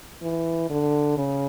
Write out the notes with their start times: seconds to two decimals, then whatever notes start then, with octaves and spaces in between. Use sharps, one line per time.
0.22 E3
0.70 D3
1.17 C#3